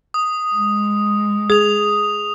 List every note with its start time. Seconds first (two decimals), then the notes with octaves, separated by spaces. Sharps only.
0.14 D#6
0.56 G#3
1.50 G#4 D#6 F7